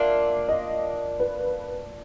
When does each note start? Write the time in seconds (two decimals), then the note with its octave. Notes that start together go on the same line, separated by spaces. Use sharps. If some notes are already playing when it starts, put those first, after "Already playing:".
Already playing: A#3 D4 F4 E5
0.49 D#5
1.20 B4